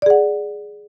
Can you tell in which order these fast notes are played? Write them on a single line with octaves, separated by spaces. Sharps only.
D5 G#4 F#5